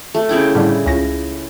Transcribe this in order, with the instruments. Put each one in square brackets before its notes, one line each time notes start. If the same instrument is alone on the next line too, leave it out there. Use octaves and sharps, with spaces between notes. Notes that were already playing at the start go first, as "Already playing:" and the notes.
[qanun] A3
C#3 E4 G5
[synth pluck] A2 D3 G3
C#2 A#6